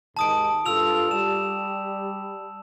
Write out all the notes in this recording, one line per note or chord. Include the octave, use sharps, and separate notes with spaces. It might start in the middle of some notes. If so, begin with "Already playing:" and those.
D#2 G#2 D#3 A5 D#6 D7
G2 F4 A4 E6 F7
G3 E7